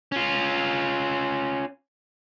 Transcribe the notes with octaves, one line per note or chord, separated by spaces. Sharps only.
C#4 F4